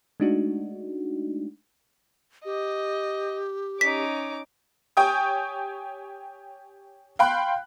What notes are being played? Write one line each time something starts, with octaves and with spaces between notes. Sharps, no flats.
G#3 A3 D4 D#4 F#4
G4 D#5
C#4 D#4 D6 B6
G4 C#5 G5 G#5 D#6
F5 G5 B5 C6 F#6